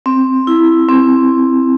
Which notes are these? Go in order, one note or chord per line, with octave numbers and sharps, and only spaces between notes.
C4
E4
C4